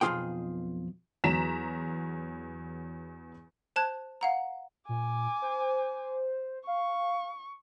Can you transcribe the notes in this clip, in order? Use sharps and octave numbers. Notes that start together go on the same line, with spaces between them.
B1 F2 B2 F4 G#4 G5
E2 F#3 A#5 B6 E7
C5 A5 F#6 G#6
F5 F#5 A#5
A#2 G#5 D6
C5
F5 C#6